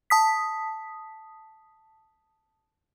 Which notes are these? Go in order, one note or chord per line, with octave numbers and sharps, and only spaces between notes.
A5 D#6 B6